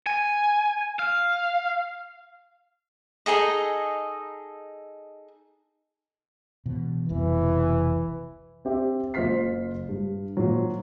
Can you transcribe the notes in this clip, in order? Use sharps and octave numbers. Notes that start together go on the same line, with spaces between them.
G#5
F5
D#4 G#4 A4 D#5
B2 E3
F1 C2 B2 E3
C4 G4 E5
F#1 F4 C5 F6 B6 C7
G2
A#2 D#3 F3 F#3